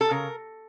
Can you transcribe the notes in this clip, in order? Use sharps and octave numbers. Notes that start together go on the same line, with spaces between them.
A4
C#3 A#4